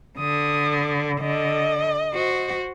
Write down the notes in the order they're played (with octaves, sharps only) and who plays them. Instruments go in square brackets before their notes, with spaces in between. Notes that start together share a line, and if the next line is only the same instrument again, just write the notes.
[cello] D3 [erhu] D#6
[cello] D3 [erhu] D#5
[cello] F#4 C5